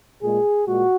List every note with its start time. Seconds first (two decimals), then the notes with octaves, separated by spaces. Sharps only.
0.23 A#2 G#3 G#4
0.68 A#2 G#3 F#4